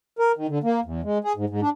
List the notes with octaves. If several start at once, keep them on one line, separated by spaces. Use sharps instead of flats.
A#4
D#3
D3
A#3
E2
G#3
G#4
G#2
G#2
D4